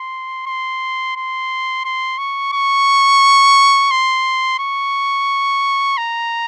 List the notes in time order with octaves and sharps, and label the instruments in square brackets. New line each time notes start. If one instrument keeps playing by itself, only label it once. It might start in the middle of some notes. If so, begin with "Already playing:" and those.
Already playing: [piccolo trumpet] C6
C6
C6
C6
C#6
C#6
C6
C#6
A#5